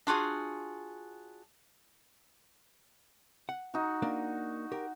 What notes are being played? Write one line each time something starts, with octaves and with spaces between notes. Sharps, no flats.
D4 F4 F#4 G#4
F#5
D#4 F#4
A#3 D4 A#4
G4 A#4